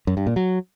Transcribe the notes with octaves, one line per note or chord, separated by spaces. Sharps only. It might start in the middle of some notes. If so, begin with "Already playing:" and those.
F#2
G2
A#2
F#3